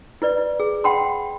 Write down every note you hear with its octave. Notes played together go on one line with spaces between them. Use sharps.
E4 B4 D5
G#4
F#5 G5 A5 B5 C6